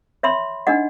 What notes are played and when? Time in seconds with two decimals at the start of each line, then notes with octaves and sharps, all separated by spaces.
0.23 C#5 E5 B5 C6
0.67 D4 D#4 D#5 F#5